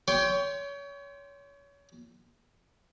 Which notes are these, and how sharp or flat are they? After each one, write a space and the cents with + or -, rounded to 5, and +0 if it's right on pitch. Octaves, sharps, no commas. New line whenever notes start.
C#5 +30 G5 +0 C6 +0